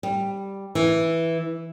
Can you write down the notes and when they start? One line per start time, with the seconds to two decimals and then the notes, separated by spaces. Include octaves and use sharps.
0.03 G3
0.75 E3